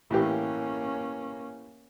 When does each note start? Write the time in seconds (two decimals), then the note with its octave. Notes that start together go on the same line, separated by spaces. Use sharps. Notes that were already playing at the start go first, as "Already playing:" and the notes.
0.11 A2 E3 A#3 C#4 G4